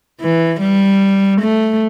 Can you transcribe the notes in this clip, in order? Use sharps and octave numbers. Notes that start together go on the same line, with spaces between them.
E3
G3
A3